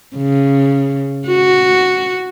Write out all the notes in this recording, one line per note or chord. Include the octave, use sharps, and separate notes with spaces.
C#3
F#4